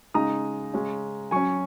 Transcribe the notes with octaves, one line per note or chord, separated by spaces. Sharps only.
C#3 G#3 D#4 A#5 D#6
C#3 G#3 C#4
F#3 C#4 G#5 C#6